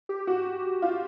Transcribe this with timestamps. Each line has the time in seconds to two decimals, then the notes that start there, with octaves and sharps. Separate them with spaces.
0.09 G4
0.27 F#4
0.82 F4